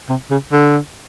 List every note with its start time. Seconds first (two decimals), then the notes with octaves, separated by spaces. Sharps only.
0.09 C3
0.31 C#3
0.52 D3